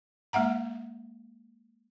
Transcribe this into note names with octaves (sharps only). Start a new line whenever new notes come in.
G#3 A#3 E5 F#5 A#5